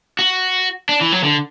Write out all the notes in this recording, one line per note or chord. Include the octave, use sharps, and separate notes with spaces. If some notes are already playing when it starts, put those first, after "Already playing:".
F#4
D4
E3
F#3
D3